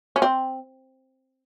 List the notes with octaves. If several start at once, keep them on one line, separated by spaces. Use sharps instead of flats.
C#4
C4